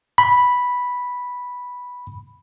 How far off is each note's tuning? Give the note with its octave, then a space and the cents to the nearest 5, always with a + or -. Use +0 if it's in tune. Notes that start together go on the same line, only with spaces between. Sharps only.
B5 -5